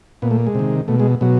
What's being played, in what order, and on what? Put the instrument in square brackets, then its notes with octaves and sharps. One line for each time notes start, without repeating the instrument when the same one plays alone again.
[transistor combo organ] A#2 B3
A3
G#3
C3 D#3
B2 A3
G#3
B2 F#3